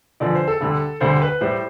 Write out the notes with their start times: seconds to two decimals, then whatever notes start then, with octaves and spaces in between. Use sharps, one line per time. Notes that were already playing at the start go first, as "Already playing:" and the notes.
0.20 E2 D3 F3 D5
0.34 C5
0.47 A4
0.61 D2 D3 G3
1.01 D2 D3 G3 C5
1.22 B4
1.41 A2 G3 C5